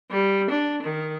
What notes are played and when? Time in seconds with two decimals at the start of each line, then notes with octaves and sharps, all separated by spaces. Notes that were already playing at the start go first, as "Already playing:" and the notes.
0.11 G3
0.50 D4
0.83 D#3